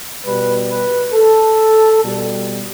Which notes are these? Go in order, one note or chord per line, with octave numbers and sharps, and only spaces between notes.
B2 G3 B4
B4
A4
B2 G3